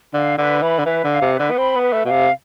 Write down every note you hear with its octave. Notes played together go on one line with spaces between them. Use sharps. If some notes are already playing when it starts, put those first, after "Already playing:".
D3 F5
D3 B4
E3 B5
D3
E3 B4
D3
F5
C3
B4
D3
B3
C4 B5
B3
B4
A3
B2 F5
C3